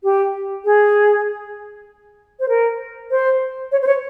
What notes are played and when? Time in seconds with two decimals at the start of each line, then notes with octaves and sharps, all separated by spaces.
0.03 G4
0.65 G#4
2.40 C5
2.49 A#4
3.11 C5
3.72 C#5
3.82 C5
3.87 C#5